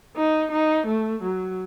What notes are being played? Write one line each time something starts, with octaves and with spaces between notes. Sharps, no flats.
D#4
D#4
A3
F#3